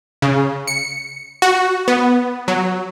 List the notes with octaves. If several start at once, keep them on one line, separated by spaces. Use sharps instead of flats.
C#3
C#7
F#4
B3
F#3